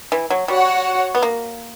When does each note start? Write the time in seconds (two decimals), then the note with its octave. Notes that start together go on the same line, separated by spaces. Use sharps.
0.12 E3
0.30 F#3
0.48 G3 F#4 C#5 F#5
1.15 B3
1.23 A#3